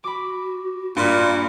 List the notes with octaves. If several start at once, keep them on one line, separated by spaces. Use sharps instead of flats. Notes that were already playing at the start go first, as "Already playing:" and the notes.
F#4 B5 D6
G2 A#2 D5 C6